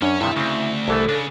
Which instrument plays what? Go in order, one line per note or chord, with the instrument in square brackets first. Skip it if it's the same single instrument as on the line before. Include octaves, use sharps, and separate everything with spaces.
[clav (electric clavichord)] F#2 [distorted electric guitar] C#4 [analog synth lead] D4
[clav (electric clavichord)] G2 C3 D#3 [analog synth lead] E4 [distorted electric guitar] A4 E5
[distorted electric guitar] D2 [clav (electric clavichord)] C#3 C4
[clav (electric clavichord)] C2 E3 A3 [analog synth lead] A4
[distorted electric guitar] C#3 [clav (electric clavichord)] D4